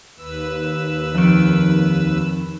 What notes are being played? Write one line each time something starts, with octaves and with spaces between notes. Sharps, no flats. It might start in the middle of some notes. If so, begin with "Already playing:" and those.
D#2 B4 E6
F2 D#3 F3